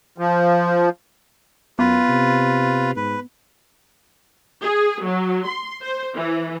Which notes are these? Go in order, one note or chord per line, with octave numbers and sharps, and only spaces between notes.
F3
F#2 B3 F4 B4
C3
G#2 B4
G#4
F#3
C6
C5
E3